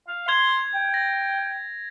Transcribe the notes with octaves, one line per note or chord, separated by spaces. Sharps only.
F5
C6 G#6 F7
G5
A#6